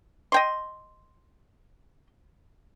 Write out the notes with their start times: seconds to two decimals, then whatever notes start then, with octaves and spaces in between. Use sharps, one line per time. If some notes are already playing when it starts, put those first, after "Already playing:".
0.32 D#5 G5 C6